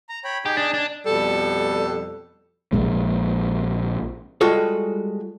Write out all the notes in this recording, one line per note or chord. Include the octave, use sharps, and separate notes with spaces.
A#5
C#5 G5 B5
D#4 G4 G#4
D4
D4
F2 B2 G3 A4
A#1 A#2 G#3
G3 G#3 F4 F#4 G#4 A4